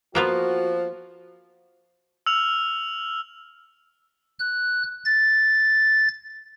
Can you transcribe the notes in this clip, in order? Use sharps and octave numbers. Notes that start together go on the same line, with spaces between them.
F3 A#3 B3 F4 F#4
E6 F6 F7
F#6
A6